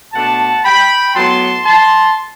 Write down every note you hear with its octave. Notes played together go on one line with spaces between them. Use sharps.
B2 A3 D4 F#5 A5
G5 B5
A2 F#3 B3 A5 C6
A5 C6